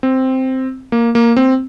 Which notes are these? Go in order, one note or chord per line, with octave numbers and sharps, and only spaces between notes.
C4
A#3
A#3
C4